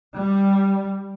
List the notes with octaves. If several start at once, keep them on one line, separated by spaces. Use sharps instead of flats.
G3